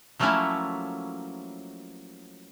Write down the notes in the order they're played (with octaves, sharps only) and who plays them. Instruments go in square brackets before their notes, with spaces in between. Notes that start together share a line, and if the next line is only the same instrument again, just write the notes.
[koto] F3 F#3 A3 A#3 C#4 E4